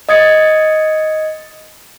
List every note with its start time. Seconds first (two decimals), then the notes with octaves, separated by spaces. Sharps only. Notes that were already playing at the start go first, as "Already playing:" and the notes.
0.09 D#5 D#6 G#6 A6 C#7